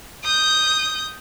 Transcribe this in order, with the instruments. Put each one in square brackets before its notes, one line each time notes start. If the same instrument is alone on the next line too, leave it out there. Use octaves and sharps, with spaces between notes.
[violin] D#6 G6